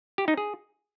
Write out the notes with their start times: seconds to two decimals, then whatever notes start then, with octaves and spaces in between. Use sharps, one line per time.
0.18 G4
0.28 D#4
0.37 G#4